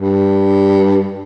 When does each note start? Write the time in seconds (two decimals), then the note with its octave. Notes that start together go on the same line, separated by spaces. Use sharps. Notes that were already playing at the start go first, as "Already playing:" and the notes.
0.01 G2